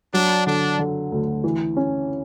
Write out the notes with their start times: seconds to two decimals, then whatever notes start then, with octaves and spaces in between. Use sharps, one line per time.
0.14 F#3 D4
0.46 D3 D4
0.79 D3
1.12 D2
1.44 E3
1.77 C#4